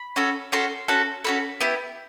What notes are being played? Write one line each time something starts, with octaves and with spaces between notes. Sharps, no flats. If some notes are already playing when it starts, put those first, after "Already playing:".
Already playing: B5
C#4 F#4 A4
C#4 F#4 A4 C6
C#4 F#4 A4
C#4 F#4 A4 B5
B3 E4 G4